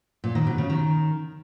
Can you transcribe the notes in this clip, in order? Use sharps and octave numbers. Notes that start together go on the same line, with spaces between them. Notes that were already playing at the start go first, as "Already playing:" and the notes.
A#2
D#3
B2
C#3
D#3